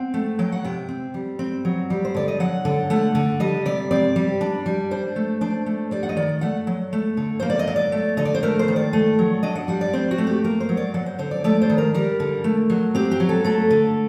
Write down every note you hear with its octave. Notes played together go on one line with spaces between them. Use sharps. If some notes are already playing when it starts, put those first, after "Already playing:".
Already playing: C4 F#5
A3
F#3 G5
F#5
C3 G5
C4
G3
C4
F#3
G3
C5
D3 D5
D#5
F#3 F#5
D3
A3 F#5
D3
G3 D#5
C3 D5
C4 D5
G3
D4
G3
D4 C5
A3
D4 C5
A3
G3 D5
F#5
D#5
D#3 D5
A3 F#5
F#3
A3
D3
A#3 C5
D5
D#5
F#3
D5
A3
D3 D#5
D5
C5
A3 A#4
C5
D#3
D5
A3
F#3
D4 D#5
F#5
G3 F#5
D5
C4 C5
F#4
A3
G4
A#3 A#4
C5
F#3
D5
F#3 F#5
C5
D3 C5
D5
A3 D5
C5
D#3
A#4
G3 A#4
D3
A3
F#3
C4 G4
G4
F#3
A4
A3 A4
D3